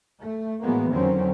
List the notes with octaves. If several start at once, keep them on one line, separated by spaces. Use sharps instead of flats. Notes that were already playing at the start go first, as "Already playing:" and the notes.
A3
A2 E3 F#3 G#3 A#3 B3
F2 D3 D#3 F#3 C4 C#4